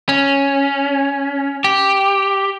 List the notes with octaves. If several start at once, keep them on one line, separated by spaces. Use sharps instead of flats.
C#4
G4